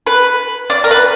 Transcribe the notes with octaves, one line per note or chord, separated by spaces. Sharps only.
B4
D5
A#4
B4